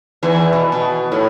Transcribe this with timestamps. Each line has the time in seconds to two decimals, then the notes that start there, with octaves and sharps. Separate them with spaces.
0.23 E2 E3
0.53 B2
0.72 B2
1.12 A2